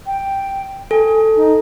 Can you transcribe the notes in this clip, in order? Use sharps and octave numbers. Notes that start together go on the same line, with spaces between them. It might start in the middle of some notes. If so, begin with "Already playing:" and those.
G5
A4 G#5
D#4